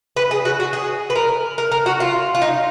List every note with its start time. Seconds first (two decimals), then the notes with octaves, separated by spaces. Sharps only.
0.16 B4
0.31 G#4
0.45 F#4
0.60 F#4
0.73 G#4
1.10 B4
1.15 A#4
1.58 A#4
1.72 A#4
1.86 F#4
2.00 F4
2.35 F4
2.42 D#4